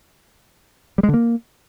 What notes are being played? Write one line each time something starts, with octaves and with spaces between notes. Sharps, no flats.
G3
G#3
D3
A#3